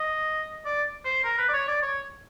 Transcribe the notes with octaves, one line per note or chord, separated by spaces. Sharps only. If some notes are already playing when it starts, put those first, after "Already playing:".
Already playing: D#5
D5
C5
A#4
B4
D5
C#5
D5
C#5